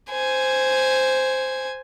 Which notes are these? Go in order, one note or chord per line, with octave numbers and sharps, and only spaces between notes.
C5 G#5